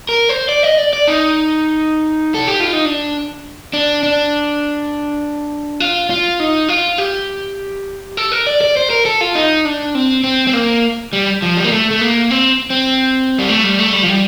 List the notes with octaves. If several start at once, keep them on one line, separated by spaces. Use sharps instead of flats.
A#4
C5
D5
D#5
D5
D5
D#4
A4
G4
F4
D#4
D4
D4
D4
F4
F4
D#4
F4
G4
A4
A#4
D5
D5
C5
A#4
A4
F4
D#4
D4
C4
C4
C4
A#3
G3
F3
G3
A#3
A3
A3
A#3
C4
C4
G3
A3
G3
A3
G3
F3
G3